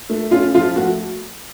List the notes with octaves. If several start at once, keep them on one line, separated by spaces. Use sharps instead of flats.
A3
C#4 F4
F3 F4
A3 F#4